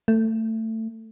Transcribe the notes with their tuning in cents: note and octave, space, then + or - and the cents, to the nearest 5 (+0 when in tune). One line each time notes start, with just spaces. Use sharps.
A3 +20